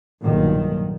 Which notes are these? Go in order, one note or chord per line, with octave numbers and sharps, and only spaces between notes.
B1 G2 A#2 D#3